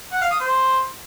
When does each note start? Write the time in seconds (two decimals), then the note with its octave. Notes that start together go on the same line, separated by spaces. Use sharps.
0.12 F#5
0.21 F5
0.31 D#6
0.40 C5